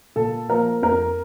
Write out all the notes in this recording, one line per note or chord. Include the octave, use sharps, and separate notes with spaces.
A#2 A4
F3 A#3 A#4
F2 A#4